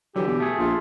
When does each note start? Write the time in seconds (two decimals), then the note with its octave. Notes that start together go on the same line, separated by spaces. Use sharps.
0.16 D3 E3 F#3 G4
0.27 B2
0.40 A3 G#4
0.58 A#1 F4